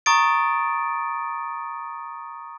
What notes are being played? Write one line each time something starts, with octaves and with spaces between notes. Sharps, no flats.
A#5 C#6 D#6 A6 D7